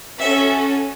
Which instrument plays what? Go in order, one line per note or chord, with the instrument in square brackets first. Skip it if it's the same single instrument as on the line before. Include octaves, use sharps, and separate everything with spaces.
[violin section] C#4 F#4 A4 E5